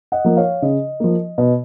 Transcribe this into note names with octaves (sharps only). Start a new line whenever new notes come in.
D#5 F#5
F3 A#3
C#5 F5
C#3 D#5
F3 A#3
B2